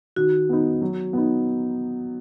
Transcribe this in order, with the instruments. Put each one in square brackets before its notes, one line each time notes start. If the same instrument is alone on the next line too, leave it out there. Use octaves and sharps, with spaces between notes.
[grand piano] D#3 [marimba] F#4
[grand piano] B3 D#4
F#3
B3 D#4